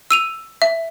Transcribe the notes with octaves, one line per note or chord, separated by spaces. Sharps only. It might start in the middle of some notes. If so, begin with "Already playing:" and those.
E6 D#7 F7
E5